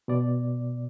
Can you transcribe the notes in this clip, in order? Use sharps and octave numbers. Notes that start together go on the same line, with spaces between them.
B2 D5